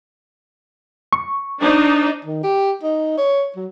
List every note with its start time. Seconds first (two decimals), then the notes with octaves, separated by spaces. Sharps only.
1.13 C#6
1.60 D4 D#4 C5
2.25 D#3
2.43 G4
2.83 D#4
3.18 C#5
3.56 F#3